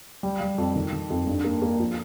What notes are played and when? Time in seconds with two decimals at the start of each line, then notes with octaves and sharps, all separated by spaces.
0.23 G3
0.41 G3
0.58 F2
0.76 D#3
0.92 D#3
1.10 F2
1.27 G2
1.44 A#3
1.62 A#3
1.79 F3